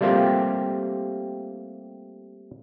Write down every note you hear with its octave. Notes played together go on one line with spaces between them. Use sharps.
G3 A3 A#3 C4 F4 G4